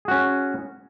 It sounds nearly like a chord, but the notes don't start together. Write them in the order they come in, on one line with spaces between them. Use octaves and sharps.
G#4 F#4 C#4